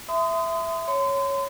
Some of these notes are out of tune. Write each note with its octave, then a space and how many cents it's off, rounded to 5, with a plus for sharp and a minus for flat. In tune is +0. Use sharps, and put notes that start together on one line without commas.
E5 +5 C6 -40 D#6 +0
C#5 +0 C6 -35